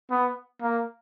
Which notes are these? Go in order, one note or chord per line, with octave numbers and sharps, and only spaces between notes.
B3
A#3